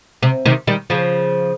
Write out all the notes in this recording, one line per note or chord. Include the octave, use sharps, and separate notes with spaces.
C3
C3 D#3
D#3 G3
C#3 F3